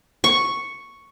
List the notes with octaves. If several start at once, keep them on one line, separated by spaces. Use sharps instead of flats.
C#6